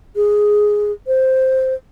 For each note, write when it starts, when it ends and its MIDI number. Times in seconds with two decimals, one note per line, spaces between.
0.16 0.92 68
1.07 1.74 72